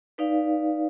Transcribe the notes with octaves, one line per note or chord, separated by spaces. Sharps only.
D#4 B4 D5 F5